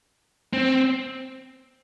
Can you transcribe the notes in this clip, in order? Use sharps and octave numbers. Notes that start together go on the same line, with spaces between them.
C4